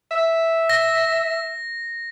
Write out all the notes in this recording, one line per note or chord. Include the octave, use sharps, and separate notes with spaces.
E5
A#6